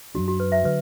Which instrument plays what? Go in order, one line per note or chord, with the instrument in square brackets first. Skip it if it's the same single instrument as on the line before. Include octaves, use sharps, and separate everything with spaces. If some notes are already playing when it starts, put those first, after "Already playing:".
[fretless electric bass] F#2 F#3 A3 D4 [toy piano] F#4
[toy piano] F#4
B4
E5
[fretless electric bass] D3 F#3 [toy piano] B4